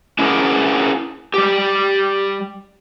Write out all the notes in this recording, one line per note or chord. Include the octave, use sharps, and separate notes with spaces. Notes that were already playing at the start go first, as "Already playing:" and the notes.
C#4 D4 E4 F#4 G#4 A#4
G3 G4